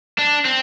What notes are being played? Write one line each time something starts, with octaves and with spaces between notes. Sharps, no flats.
D4
C4